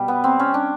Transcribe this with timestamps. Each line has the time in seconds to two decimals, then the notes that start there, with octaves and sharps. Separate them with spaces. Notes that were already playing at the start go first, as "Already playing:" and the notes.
Already playing: B2 G3
0.08 B3
0.24 C4
0.40 C#4
0.54 D4